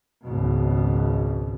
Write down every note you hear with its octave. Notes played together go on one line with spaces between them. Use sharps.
G#1 C#2 B2